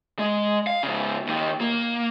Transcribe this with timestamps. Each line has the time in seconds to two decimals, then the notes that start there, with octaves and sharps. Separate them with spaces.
0.19 G#3
0.67 F5
0.83 G#2 C#3
1.27 D#2 D#3
1.61 A#3